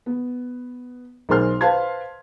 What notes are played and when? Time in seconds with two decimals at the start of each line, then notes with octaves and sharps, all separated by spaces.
0.06 B3
1.29 B1 G#4 A#4 C5 C6 F6
1.61 B4 C5 F5 A5 C6 G#6